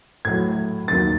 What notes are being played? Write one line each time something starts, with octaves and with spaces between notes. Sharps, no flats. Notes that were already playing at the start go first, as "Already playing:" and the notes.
A2 F#3 G#6
D#2 D#3 F#3 A6